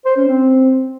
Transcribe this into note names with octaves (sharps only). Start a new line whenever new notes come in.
C5
C#4
C4